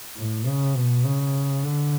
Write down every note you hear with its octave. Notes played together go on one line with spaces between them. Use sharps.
A2
C#3
B2
C#3
D3